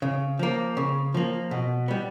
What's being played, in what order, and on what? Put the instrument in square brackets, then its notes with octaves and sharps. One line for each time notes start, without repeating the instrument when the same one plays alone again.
[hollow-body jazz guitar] C#3
F3 A#3
C#3
F3 A#3
B2
G3 B3